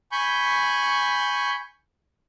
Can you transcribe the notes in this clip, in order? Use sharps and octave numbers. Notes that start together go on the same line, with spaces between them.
G#5 B5 C#6 G6